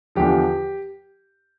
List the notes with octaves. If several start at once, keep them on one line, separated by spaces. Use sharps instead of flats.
E2 D3 F3 G4